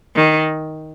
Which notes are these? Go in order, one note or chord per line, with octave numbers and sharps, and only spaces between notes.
D#3